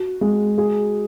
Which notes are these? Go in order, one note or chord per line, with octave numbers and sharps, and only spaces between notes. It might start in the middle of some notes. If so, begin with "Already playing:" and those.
Already playing: F#4
G#3
G#4